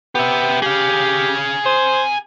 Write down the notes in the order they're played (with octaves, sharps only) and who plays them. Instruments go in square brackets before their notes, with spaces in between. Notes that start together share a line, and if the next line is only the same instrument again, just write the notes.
[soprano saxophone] B3 [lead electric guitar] G4 E5
[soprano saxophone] G4 [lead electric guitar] G#4 F5
[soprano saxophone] C5